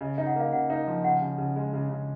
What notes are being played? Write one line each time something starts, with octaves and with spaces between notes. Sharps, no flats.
C#3 D#5
D#4
F#5
A#3 F5
C#3 F#5
D#4
F3
C#3 F#5
C#3
C#3
G#3
C#3
C#3